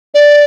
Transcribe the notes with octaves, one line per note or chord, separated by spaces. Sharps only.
D5